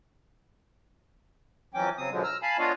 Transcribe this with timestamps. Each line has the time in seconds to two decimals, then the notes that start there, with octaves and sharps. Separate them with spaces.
1.74 F2 E3 F#3 C#4 G5 D6
1.98 C#3 F#3 C4 D#6
2.11 F#2 B2 D3 F3 F#3 G#3
2.23 A#5 E6 F6
2.42 F5 G#5 A5 B5
2.59 B3 D4 F4 C#5 D#5 F5